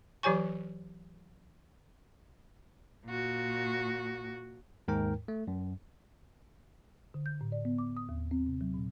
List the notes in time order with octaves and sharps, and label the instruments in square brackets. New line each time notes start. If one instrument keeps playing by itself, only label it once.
[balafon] E3 F#3 G4 C#5 G#5 C#6
[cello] A#2 F#4
[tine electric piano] D#2 G#2 A#4 G5 A#5
A3
F#2
[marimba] D3
G6
A2
D5
B3
D6
D#6
D#2
C4
C3
F#3
A#2